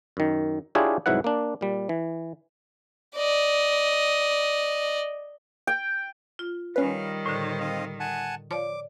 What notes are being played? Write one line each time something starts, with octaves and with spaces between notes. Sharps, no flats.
F#2 D#3
D4 E4 F4 G4 G#4 C#5
C2 G#2 F#3 E4 B4 F#5
A#3 D4
A#2 G3
E3
D5 D#5
G5
F4
D#3 G3 C#4 B4 F5
A2 D3 C5 C#5
C4 D#5 F5
F#5 G#5 A5
F3 C#5 D5 D6